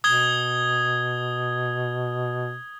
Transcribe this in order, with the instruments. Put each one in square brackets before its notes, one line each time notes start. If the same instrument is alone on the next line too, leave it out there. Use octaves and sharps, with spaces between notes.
[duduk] B2 [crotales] D#6 G#6 G7